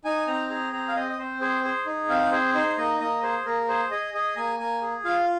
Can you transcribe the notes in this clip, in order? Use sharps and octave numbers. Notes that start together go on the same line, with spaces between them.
D#4 G#5
C4 A#5
G#4 A#5
C4 A#5
F5
C4 D#5
D#5
C4 C5
G#4 C5
G#4 C5
D#4
C4 F5
G#4 C5
D#4 C5
A#3 D#5
A#3 D#5
G#4 C5
A#3 A#4
G#4 C5
G#4 D#5
G#4 D#5
A#3 G#5
A#3 G#5
G#4
F4 F5